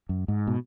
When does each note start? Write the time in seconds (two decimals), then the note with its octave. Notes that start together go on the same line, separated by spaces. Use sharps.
0.09 F#2
0.28 G#2
0.47 B2